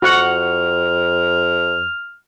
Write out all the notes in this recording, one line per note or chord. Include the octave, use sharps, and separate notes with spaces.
F2 F#4 F#5 F6